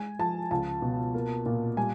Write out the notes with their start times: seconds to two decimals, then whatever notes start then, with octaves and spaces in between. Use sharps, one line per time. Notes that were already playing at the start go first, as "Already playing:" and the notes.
Already playing: G#3 G#5
0.19 F3 A5
0.51 C#2 A5
0.82 B2
1.14 A#3
1.46 A#2
1.77 G3 G#5